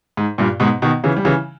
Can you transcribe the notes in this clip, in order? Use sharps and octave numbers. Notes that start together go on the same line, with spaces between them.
G#2
G2 A#2
G#2 B2
B2 D#3
C#3 E3
G3
C#3 E3